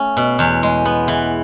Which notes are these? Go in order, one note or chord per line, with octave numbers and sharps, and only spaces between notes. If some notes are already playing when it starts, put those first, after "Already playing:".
Already playing: A3 C#4
B2
E2
G#3
B3
E3